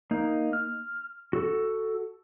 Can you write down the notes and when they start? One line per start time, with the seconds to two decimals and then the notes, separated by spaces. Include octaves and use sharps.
0.11 A#3 D#4
0.53 F6
1.33 F#4 A4